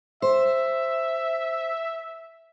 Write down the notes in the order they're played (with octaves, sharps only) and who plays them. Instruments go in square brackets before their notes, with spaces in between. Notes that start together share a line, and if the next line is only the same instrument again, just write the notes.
[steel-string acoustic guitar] C5 [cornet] E5